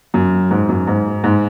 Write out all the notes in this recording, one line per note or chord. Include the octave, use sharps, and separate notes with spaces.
F#2
G#2
F#2
G#2
G#2